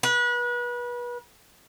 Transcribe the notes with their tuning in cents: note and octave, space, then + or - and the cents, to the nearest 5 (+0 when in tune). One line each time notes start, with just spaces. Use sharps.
B4 -30